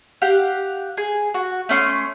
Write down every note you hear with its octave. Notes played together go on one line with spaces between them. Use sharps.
G4 F5 F#5
G#4
F#4
A3 C#4 C6